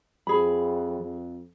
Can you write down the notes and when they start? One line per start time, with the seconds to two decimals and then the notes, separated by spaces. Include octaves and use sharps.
0.27 F2 G#4 B5
1.00 F2